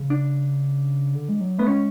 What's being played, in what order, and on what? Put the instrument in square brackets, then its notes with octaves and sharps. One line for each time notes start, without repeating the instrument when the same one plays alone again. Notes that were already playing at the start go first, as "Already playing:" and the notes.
Already playing: [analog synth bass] C#3
[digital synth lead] D4
[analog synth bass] D3
G#3
F#3
[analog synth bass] A3 [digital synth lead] B3
[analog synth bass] G#3 [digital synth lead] C#4